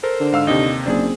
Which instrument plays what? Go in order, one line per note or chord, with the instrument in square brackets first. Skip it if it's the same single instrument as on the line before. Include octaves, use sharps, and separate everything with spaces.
[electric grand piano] A4 A#4 [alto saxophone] C5
[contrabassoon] D3
[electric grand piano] G#2 F5 E6
[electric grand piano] D#2 C3 [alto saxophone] D#4
[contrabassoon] F#1 [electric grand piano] C4 G#4 [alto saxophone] D4